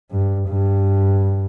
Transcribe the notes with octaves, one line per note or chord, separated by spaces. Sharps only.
G2
G2